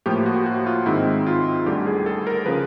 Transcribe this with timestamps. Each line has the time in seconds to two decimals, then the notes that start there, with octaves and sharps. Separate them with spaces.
0.06 A2 F3 A#3 G4
0.26 F#4
0.46 F#4
0.66 F4
0.86 G#2 D#3 G#3 C4 E4
1.27 F4
1.66 D2 D3 G3 G4
1.87 G#4
2.06 A4
2.27 A#4
2.46 C#3 F3 B4